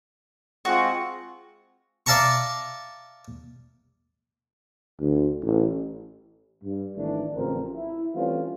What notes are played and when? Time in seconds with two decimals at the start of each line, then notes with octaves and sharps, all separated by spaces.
0.65 G#3 C4 F4 F#4
2.06 D5 E5 F5 A5 A#5 C#6
5.00 D2
5.44 A1
6.64 G2
6.97 G#1 D#3 E3 A3 D4
7.36 A1 C#3 F3 C4 A#4
7.75 E4
8.15 E3 G3 A3 C4 C#4 F4